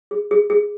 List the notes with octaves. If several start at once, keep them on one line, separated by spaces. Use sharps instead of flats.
G#4
G#4
G#4